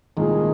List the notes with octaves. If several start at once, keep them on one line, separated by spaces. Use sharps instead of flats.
C2 A#2 D#3 G#3 A#3 G#4